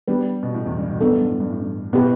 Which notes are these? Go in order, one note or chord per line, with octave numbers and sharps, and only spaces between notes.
G3 B3 D4 G4 B4
B2
A2
E2
G2
B2
G2 B3 D4 A4
A2
G2
A2
G2
A2
G2
B2 B3 E4 G4 B4